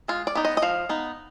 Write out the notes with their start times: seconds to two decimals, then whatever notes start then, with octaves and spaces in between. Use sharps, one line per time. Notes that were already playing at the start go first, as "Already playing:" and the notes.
0.08 G#3 F4
0.27 D5
0.35 B3 D#4
0.45 D#5
0.57 D#5
0.62 F3 F5
0.89 B3 D#4